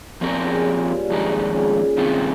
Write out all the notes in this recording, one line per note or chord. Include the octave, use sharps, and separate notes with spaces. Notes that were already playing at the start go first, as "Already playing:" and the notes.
A#2 F3 C4 G4 A#4
C#3
C#3
G2
F2 G#2 D#3 G#3 D#4
A#2
C#3
C3 D#3 G3 C4 F4